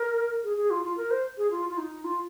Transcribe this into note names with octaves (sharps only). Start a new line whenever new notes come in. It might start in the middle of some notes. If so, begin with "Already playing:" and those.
Already playing: A#4
G#4
G#4
F4
F4
A#4
C5
G#4
F4
F4
D#4
F4